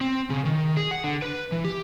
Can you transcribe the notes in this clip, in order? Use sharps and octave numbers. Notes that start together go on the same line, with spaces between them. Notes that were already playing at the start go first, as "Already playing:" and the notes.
C4
C#3
D#3
G#4
F#5
D3
B4
E3
G4